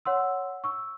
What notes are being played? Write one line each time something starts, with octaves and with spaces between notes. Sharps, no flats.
C#5 F#5 C6 E6
C#6 E6